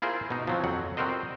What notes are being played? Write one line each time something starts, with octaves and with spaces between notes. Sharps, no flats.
E4 F4 G#4 A#4 C5
B2 D#4
F3 F#3 C4
F2 F#3 F#5
G3 C4 F#4 A#4 C5 D#5